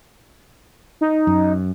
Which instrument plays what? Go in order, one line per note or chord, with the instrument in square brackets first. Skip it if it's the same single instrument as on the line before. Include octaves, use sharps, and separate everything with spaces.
[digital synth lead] D#4
[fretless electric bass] F#2